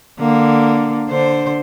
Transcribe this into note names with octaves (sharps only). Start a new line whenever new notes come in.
D3 A#3
D3 C5